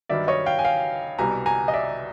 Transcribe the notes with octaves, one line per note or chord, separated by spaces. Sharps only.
G2 D#3 F#3 D5 E5
C#5 D#5
F5 G5
G#5
F5 G5
C2 B2 G3 G#5 A#5
G#5 A#5
D#5
D5 E5